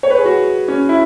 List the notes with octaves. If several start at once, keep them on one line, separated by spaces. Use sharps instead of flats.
C#5
B4
G#4
F#4
C#4
E4